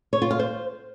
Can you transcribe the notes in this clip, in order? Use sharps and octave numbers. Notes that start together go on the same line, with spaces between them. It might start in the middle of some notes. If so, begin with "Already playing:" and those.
C#5
F4
F5
C5